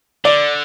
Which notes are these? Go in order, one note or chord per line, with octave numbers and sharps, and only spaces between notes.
D3 D5